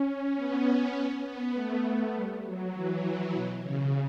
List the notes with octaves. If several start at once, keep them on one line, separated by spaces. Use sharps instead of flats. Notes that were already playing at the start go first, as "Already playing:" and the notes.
Already playing: C#4
B3
B3
C#4
B3
A3
G3
F#3
E3
B2
C#3